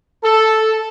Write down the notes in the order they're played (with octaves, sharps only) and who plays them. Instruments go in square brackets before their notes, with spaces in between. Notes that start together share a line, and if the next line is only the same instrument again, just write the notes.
[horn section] A4